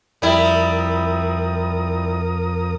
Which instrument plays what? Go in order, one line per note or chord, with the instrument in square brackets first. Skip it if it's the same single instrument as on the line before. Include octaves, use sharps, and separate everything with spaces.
[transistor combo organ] F2 A#4 D#6 [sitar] G3 E4